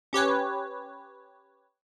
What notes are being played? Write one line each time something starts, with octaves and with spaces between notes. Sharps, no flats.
C#4 G4 B4 C#5